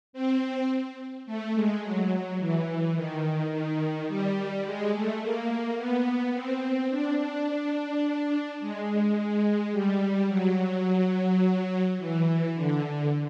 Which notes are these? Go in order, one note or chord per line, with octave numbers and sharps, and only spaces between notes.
C4
A3
G#3
F#3
E3
D#3
D#3
G3
G#3
A3
A#3
B3
C4
D4
D4
G#3
G#3
G3
F#3
E3
D3